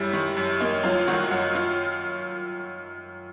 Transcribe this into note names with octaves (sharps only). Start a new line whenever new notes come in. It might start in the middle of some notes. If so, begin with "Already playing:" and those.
Already playing: F#2 G3 E4
D#3
F#2
A#3 D#4
F#3 F4
D#3 F#4
F#2 F#4
F4